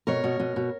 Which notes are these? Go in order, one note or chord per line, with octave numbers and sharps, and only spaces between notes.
B2 A#4 C#5
B2
B2
B2